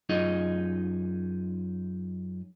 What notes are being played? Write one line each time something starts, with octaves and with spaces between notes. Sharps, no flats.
F#2 D#4 F4 G#4 D#5